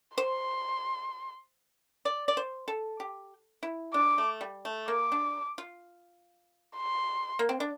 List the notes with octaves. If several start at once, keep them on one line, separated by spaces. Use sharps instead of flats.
C5 C6
D5
D5
C5
A4
G4
E4
D4 D6
A3
G3
A3
A#3 D6
D4
F4
C6
A#3
C4
D4